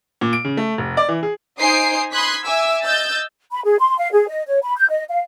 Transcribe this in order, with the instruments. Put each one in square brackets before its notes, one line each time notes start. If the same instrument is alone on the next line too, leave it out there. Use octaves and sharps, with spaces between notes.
[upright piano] A#2
D7
C#3
A3
F1
D5
E3
G#4
[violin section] D#4 C5 G#5 D#6 C7 D7
B5 C6 D#6 F#6 G#6 B6
E5 G#5 D6 E6
D#5 E6 G6 A6
[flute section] B5
G#4
C6
F5
G#4
D#5
C#5
B5
G6
D#5
F5